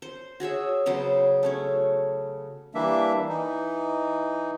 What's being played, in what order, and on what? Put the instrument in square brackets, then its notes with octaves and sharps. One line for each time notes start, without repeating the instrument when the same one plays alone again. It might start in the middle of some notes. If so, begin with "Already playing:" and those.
[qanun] C5
F#4 G#4 C#5 E5
C#3 F#3 B3 C5
A3 C#4 C#5
[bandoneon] E3 G3 A#3 D4 E5
E3 D#4